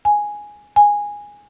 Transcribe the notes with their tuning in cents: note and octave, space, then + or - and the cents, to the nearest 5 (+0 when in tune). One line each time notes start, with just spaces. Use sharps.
G#5 +0
G#5 -10